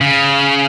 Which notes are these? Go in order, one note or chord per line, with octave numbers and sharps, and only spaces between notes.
C#3